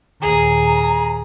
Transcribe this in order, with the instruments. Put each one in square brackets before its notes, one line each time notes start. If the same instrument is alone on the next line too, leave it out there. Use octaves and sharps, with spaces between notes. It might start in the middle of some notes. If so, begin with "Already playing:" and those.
[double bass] D#2 A#2 [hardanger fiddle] G#4 [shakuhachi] A#5